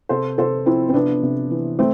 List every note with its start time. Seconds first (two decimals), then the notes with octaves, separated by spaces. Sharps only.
0.09 C3 A4 C5
0.38 C3 A4 C5
0.66 F3 C4 E4
0.89 C4
0.94 C3 B3 D4
1.23 C3
1.51 E3
1.79 A3 C4